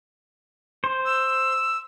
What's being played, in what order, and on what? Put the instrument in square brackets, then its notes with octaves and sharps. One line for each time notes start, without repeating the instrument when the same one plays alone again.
[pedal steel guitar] C5
[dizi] E6